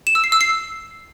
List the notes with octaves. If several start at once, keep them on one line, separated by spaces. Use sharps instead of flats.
E7
E6
C7
E6
C7